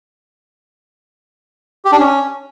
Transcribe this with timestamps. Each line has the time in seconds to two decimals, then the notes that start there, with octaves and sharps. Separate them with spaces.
1.85 G4
1.92 D4
1.99 C#4